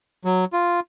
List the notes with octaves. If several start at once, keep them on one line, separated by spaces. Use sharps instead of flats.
F#3
F4